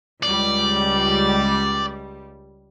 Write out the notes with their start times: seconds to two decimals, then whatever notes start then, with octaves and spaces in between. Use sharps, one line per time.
0.23 C#2 G3 D5